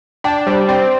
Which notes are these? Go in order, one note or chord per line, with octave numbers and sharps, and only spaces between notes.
D4 G5
G3 C5
C4 D5